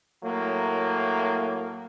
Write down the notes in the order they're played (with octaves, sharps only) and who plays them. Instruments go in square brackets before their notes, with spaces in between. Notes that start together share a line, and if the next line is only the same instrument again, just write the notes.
[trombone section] A2 F#3 A#3